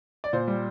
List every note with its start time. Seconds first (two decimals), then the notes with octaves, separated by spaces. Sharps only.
0.24 D5
0.33 A#2 C5
0.48 G3